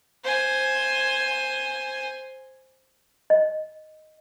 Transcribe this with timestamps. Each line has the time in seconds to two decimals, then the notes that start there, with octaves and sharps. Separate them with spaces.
0.24 C5 G#5
3.30 D#5